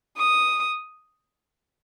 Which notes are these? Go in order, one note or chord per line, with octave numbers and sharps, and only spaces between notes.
D#6